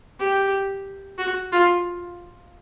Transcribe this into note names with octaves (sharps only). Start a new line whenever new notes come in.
G4
F#4
F4